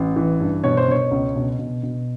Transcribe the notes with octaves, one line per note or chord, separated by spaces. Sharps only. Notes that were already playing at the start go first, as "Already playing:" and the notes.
Already playing: A1
E3
G2
B2 C#5
C5
B2 C#5
C#2
B2
B2
B2